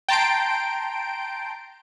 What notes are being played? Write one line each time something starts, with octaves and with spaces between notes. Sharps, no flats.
G5 A5 A#5 C6 G6 D7